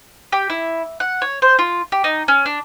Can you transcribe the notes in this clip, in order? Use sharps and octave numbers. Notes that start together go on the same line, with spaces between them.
G4
E4
F#5
C#5
C5
F4
G4
D#4
C#4
D4